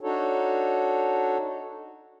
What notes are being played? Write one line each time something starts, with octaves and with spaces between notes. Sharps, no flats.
D4 D#4 F#4 A4 C#5